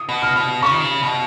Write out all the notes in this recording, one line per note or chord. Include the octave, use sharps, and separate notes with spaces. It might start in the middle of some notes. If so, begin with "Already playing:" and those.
Already playing: D#6
B2
F6
B2
C#3 C#6
D#3
C#3
B2